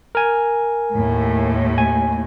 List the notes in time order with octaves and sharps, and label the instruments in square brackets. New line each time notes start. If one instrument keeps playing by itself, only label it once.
[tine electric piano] A#4 G#5
[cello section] D#2 A2
[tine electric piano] G#5